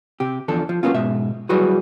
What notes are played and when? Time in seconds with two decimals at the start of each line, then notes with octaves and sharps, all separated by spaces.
0.20 C3 G4
0.48 E2 F3 D4 A4
0.69 F3
0.83 F#3 G#3 A#3 B3 C#4 F4
0.95 G#2 B2 E5
1.49 F#3 G3 E4 F#4 G#4 B4